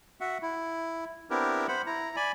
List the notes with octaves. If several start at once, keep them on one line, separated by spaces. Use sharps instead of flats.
F#4 E5 F#5
E4
B3 C4 D4 E4 G4 A#4
C5 F#5 B5
E4 A#5
D5 G#5 B5